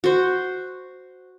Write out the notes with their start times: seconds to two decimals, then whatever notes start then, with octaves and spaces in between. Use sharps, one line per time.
0.04 F#4 C5